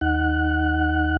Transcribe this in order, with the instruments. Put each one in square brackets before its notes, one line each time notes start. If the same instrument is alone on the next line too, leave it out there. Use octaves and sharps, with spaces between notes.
[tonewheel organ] D#2 D#4 F#5 F#6